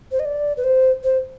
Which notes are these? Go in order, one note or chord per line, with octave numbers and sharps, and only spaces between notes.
C5
D#5
D5
B4
C5
C5